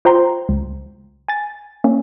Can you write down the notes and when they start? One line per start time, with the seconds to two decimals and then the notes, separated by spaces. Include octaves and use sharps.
0.05 F4 C5 G5 A#5 C6
0.49 C#2
1.28 G#5 A6
1.84 A#3 C#4